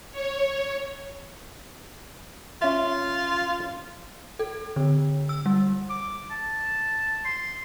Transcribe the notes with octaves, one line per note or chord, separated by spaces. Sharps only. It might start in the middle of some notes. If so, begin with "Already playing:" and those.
C#5
C#4 F4 E5
A4
D3
E6
G3
D6
A5
C6